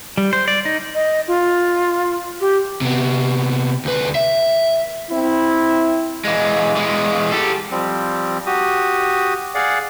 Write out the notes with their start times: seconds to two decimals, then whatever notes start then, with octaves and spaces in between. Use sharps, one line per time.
0.18 G3
0.33 C5
0.48 D5
0.65 D#4
0.95 D#5
1.28 F4
2.41 G4
2.81 C3 B3
3.85 D2 B4
4.15 E5
5.11 C4 E4
6.25 E3 G#3
6.76 E3 G#3
7.32 G4 A4
7.71 F3 G3 C4
8.47 F#4 G4 D#6
9.55 G#4 D5 F5 F#5